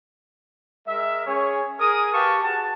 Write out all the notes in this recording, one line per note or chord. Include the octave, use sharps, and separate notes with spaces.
G#3 A#4 E5
C#4 G#4 C#5
G#4 A#4 G#5 D#6
G4 B4 F5 A5 C#6
F#4 G#4 A5